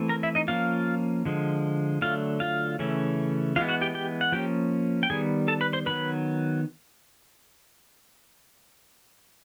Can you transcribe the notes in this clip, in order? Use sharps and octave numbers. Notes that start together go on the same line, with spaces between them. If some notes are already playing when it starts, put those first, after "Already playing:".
Already playing: E3 A3 C4
A#4 A#5
E4 E5
D#4 D#5
F3 A#3 C#4 F4 F5
D3 F3 G#3
D3 F#3 A3 F4 F5
F4 F5
C#3 E3 A3 C#4
E3 G#3 B3 F4 F5
F#4 F#5
G4 G5
G4 G5
F#5
F3 A#3 C#4 G4 G5
G5
D#3 G3 B3 G#4 G#5
A4 A5
B4 B5
C5 C6
D#3 F#3 B3 B4 B5